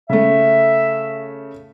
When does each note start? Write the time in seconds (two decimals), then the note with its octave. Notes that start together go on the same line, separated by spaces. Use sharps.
0.09 C#3 A3 E5